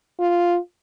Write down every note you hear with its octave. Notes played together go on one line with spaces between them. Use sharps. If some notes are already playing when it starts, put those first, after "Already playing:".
F4